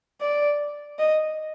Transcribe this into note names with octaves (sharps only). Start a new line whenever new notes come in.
D5
D#5